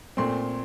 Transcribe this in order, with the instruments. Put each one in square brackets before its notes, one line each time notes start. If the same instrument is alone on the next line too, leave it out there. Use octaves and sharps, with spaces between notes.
[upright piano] A#2 A3 C4 C6